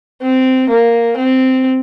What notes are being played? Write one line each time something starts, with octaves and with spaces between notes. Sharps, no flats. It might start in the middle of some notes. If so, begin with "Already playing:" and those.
C4
A#3
C4